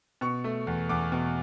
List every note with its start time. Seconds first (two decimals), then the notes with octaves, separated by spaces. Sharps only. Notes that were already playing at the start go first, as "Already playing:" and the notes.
0.21 B2 C#6
0.44 A3
0.67 E2
0.89 E2 D6
1.12 B2